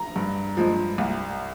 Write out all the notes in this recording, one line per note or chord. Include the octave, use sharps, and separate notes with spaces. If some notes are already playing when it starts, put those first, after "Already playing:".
Already playing: A#5
G2
F3 G#3
C2